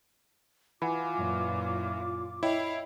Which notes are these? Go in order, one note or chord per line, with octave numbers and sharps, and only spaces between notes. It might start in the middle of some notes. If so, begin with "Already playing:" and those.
E3 F4 F#5 G#5 B5 D6
F#2 A#2
E4 C#5 D#5 F5 G5